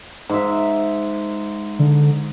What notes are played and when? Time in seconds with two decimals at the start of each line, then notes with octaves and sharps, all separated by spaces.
0.29 G#2 E5
1.79 D3